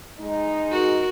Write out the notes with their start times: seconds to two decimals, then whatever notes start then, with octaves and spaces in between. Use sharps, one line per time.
0.20 G#3 D#4
0.71 F#4 A#4